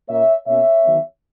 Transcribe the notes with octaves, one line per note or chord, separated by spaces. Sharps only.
A#2 A#3 C#4 C#5 E5
B2 A#3 C#4 C#5 E5
D#3 F#3 B3